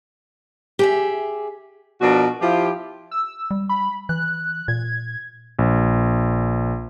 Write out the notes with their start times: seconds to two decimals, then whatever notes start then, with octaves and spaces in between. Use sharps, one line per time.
0.79 G4 G#4 E5
2.02 B2 F3 D4 F#4 A#4
2.42 F3 E4 F4 G4
3.11 E6
3.51 G3
3.69 B5
4.09 E3 F#6
4.68 A#2 G#6
5.59 A#1